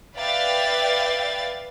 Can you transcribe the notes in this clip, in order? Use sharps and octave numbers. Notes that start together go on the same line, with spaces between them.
B4 D5 E5 F5 G5 A6